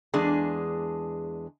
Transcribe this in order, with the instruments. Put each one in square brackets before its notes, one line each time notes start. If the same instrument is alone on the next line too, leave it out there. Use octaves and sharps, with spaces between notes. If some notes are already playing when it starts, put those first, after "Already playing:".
[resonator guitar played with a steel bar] E2 G#3 D4 G#4